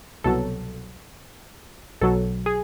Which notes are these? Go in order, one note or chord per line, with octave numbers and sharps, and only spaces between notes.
C2 B2 F#3 A4
B1 B2 F#3 A4
G#4